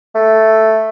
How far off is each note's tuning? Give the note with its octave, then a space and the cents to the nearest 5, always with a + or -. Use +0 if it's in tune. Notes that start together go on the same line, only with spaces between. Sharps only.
A3 +0